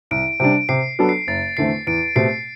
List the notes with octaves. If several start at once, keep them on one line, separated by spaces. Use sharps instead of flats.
C2 D7
C3 G3 D4 D7
C3 C7
F#3 B3 D4 A4
C7
F#1 A6
E2 D3 A3 C4 C7
E2 D7
B2 A3 C4 G4 C7